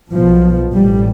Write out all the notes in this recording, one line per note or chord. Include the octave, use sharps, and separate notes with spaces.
B1 B2 F3
A1 A2 G3